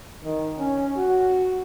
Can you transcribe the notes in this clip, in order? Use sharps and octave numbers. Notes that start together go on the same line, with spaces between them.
D#3
C#4
F#4